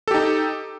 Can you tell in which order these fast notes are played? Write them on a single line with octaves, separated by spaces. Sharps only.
A4 G4 D#4